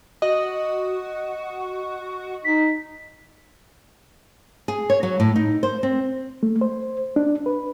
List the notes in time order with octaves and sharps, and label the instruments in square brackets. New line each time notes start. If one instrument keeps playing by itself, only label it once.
[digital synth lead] F#4 [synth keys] D#5
[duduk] D#4 [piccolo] B6
[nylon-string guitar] G#4
C#5
F#3
A2
D#4
C5
C4
[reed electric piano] A3
C5
D4
B4